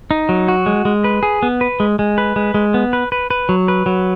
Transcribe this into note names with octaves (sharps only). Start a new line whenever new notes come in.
D#4
F#3
F#4
G#3
G#3
B4
G#4
B3
B4
G#3
G#3
B4
G#3
G#3
B3
B4
B4
B4
F#3
B4
F#3